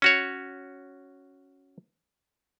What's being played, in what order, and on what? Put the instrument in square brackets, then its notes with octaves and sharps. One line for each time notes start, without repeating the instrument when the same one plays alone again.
[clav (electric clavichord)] C#4 F#4 C#5